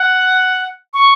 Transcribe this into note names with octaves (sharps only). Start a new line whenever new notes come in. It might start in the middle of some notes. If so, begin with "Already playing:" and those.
Already playing: F#5
C#6